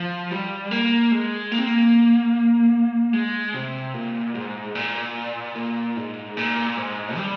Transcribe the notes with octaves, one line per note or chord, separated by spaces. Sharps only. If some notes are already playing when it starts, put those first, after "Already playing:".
Already playing: F3
G3
A#3
G#3
A#3
C4
A#3
G#3
C3
A#2
G#2
A#2
A#2
G#2
A#2
G#2
G3